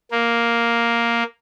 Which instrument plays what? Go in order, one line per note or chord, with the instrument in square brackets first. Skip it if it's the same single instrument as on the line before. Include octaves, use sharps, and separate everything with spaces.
[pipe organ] A#3